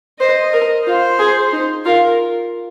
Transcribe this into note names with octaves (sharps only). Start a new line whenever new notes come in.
C5 D#5
A#4
F4 C5
G#4
D#4
F4 A#4